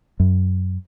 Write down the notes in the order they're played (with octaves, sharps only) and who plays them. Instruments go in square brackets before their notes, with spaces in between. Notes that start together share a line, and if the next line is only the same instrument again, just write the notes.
[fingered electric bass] F#2